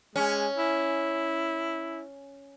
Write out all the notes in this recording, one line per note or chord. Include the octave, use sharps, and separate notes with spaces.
G#3 C#4
E4